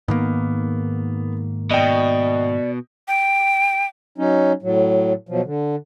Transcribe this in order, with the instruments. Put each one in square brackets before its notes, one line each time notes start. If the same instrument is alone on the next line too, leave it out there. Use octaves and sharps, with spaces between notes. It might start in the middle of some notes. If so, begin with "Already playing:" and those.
[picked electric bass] G#2 D#3 A#3 [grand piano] B3
[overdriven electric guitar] B2 [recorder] D5 [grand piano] D#5 G5
[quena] G5
[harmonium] F#3 C#4 D#4
A2 F#3
B2 F3 F#3
D3